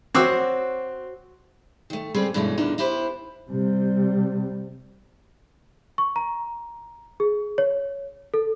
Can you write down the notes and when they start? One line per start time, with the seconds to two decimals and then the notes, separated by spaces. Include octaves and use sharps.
0.15 C4 F#4 C5 C#5 D6 E6
1.90 D#3 A3
2.14 C#3 G3 G#3 C4 G#4 B4
2.34 G2 B2 E3 G#3 A3 C#4
2.58 E2 A#2 D3 E3 D#4
2.78 B3 E4 G4 B4 C5
3.50 C3 G3
5.98 C#6
6.16 A#5
7.20 G#4
7.58 C#5
8.34 A4